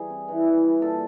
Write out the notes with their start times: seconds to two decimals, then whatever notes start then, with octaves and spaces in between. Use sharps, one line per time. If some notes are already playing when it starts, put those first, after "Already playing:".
Already playing: E3 G3 G#4
0.10 C4
0.28 E3
0.46 E3
0.63 G3
0.82 A#2 A4